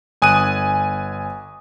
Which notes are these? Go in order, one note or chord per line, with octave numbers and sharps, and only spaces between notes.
G1 G#5 D#6 F#6 D#7